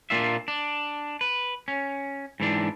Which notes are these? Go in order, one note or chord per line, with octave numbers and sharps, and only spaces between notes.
A#2 A#3 D4 F4 E5
D4
B4
C#4
G#2 E3 D4